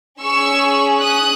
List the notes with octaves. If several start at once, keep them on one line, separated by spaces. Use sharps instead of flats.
C#4 G#4 C#6 E6
D#6 F#6